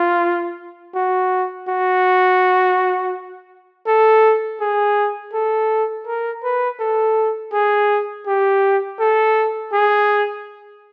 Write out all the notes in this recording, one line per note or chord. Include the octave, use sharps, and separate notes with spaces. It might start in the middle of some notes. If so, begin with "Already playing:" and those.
Already playing: F4
F#4
F#4
A4
G#4
A4
A#4
B4
A4
G#4
G4
A4
G#4